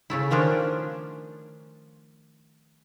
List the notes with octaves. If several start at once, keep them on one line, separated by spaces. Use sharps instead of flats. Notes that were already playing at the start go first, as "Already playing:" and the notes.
C#3 A3 E4
D#3 F3 C#4 D4